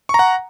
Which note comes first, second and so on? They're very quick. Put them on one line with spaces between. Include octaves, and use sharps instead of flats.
C#6 A#5 F#5